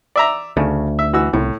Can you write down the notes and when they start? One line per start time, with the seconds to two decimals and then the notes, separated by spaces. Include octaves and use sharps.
0.16 D5 E5 A#5
0.57 D2 C#3 A3
0.99 E5
1.13 E3 F#4 E6
1.33 C2 A2